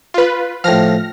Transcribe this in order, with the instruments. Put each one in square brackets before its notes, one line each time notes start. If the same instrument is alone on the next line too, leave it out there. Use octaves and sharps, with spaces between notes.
[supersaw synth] F4 B4
[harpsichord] A2 F3 [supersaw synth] F6 A#6